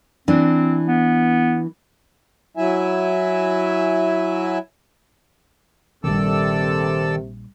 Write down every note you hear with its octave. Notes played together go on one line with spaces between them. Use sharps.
E3 C4 D4
B3
F#3 E4 E5 G#5
A#1 C3 D#3 G3 A4 D5 E6